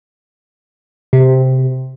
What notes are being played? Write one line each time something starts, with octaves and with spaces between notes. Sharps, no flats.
C3